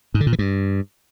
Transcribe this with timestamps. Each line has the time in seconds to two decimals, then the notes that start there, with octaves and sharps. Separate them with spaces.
0.14 G#2
0.20 D3
0.27 A#2
0.33 E3
0.39 G2